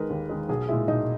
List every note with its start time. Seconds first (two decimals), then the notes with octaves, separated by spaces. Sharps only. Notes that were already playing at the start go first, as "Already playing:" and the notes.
Already playing: D#3 G#3 A#4 B4
0.10 D#2
0.30 D#3 G#3
0.49 B1 G#4
0.69 A#2 G#3 E4
0.88 B1 D#4